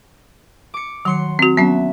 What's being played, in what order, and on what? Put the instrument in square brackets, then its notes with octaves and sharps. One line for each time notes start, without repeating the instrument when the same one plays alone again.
[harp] D6 C#7
[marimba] D#3 [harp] F#3 C6 C#7
[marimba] C4 F#4
[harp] F#3 E5 [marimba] B3 C#4